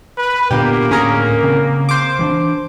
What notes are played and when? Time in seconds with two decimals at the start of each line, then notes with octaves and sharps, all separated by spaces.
0.18 B4
0.51 A#2 D3 A#3 B3 G4
0.91 D2 A2 C#4 G#4 A#4
1.43 C#3 C4
1.89 C5 D6
2.19 E3 C#4 D4